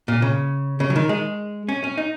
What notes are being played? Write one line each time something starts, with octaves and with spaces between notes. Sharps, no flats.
A#2
C#3
C#3
F#3
D#3
G#3
C#4
C#4
D#4